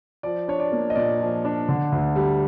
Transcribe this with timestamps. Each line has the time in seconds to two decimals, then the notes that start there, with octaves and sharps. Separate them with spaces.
0.23 F3 D5
0.48 D4 C#5
0.60 D5
0.72 A#3
0.90 D#5
0.95 A#2 D5
1.21 F3
1.45 D4
1.68 D3
1.92 D2
2.16 G3